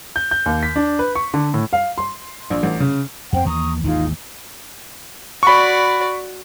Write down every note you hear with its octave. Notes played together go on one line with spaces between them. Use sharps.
G6
G6
D#2
B6
D4
B4
C#6
D3
A2
F5
C6
A#1
A1
C#3
F2 C4 C5 F#5 G5
D#2 E3 A#5 C#6 D#6
G#1 D#2 E3 D#4 F4 G#4
F#4 D5 B5 C#6